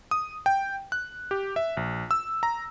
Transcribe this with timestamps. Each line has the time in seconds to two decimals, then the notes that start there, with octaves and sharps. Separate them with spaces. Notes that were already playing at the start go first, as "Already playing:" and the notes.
0.11 D#6
0.46 G5
0.92 F#6
1.31 G4
1.56 E5
1.77 A#1
2.11 E6
2.43 A#5